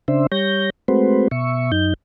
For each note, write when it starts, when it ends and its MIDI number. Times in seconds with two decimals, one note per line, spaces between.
0.08 0.27 49
0.08 0.27 62
0.08 0.27 72
0.08 0.27 76
0.32 0.70 55
0.32 0.70 73
0.32 0.70 91
0.32 0.70 94
0.88 1.28 56
0.88 1.28 57
0.88 1.28 60
0.88 1.28 66
0.88 1.28 71
0.88 1.28 72
1.31 1.71 47
1.31 1.71 76
1.31 1.71 85
1.72 1.94 42
1.72 1.94 63
1.72 1.94 91